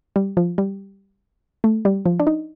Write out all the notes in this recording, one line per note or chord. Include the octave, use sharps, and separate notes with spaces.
G3
F3
G3
A3
G3
F3
D4
D#4